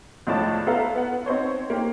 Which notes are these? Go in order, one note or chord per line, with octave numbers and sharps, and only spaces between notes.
C#2 A2 F3 C#5 D5 A5
B3 A4 E5 F5 A#5
B3 F#5
B3
C4 D#4 C5 C#5
A#3 G4